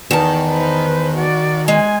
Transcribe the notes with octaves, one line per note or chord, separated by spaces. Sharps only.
E2 D#3 A5
B4 C5
F#4 D5
G#3 G#5